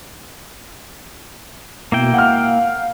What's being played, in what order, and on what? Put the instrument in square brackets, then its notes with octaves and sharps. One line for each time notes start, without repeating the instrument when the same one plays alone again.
[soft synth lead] B2 [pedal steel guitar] A#3 E4 G5
[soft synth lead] F5 [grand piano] F#5 F6